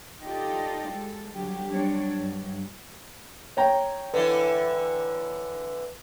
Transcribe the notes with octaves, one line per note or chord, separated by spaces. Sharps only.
D#4 F4 G4 A4 D5
G#3 A4
D3 F#3 G3 G4
F#3 G3 C4 D4 C#5 D5
G2 F#3
C#5 G5 A#5
D3 E3 B4